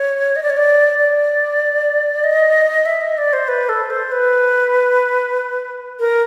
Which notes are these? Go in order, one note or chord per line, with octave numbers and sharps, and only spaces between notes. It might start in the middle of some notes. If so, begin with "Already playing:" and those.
Already playing: C#5
D#5
D5
C#5
D5
D5
D#5
E5
D#5
D5
C5
B4
A4
C5
B4
A#4